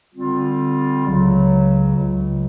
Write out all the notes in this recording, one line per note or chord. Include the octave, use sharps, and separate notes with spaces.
D3 G3 C4 F4
C#2 C#3 F#3
C#2 C#3 F#3